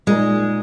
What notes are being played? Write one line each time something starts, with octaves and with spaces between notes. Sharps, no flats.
A#2 G#3 A#3 D#4